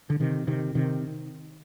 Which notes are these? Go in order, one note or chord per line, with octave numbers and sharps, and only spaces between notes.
D3
C3 D#3
C3 D#3
C3 D#3